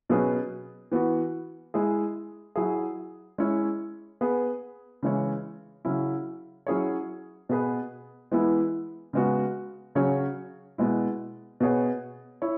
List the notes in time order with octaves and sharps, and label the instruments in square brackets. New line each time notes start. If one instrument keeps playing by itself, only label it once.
[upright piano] B2 F#3 C#4 G#4 B4
E3 B3 F#4
G#3 E4 G#4
F#3 E4 G#4
G#3 C#4 E4 C#5
B3 G#4 B4
C#3 E3 G#3 E4 C#5
C#3 F#3 C#4 E4
F#3 C#4 E4 G#4 C#5
B2 B3 G#4 B4
E3 G#3 B3 E4
C#3 G#3 B3 F#4
C#3 F#3 C#4 G#4 C#5
B2 G#3 E4
B2 B3 G#4 C#5
E4 C#5